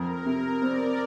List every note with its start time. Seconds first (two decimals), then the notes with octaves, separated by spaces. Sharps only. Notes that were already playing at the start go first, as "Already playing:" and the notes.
Already playing: F2 A#4
0.26 C3 A#4
0.62 C4 D5